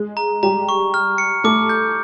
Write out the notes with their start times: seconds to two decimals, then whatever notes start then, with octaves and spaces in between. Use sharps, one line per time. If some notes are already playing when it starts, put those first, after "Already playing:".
Already playing: G#3 G#4
0.17 A#5
0.43 G3 G4 A#5
0.69 C#6
0.94 F6
1.18 C#7
1.44 A3 A4 D6
1.69 G6